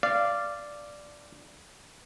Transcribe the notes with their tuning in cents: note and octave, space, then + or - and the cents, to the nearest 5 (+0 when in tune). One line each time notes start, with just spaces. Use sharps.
D5 +0 F5 -20